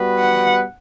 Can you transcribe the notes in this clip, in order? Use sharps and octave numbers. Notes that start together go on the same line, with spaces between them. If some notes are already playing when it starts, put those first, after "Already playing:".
Already playing: G3 B3 F#4 B4
F#5